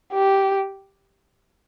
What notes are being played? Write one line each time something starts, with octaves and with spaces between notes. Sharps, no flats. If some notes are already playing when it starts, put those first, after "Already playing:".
G4